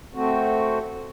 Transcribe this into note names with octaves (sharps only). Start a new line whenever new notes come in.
A3 C4 F#4